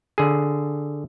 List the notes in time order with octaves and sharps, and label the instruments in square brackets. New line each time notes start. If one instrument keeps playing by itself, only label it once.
[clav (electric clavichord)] D3 G#4